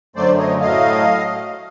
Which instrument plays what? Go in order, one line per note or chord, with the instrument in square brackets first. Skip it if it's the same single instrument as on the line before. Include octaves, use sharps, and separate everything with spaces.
[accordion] F#2 D3 F#3 A3 C5 D5
C#5 D#5
A2 F#3 A3 D#5 F5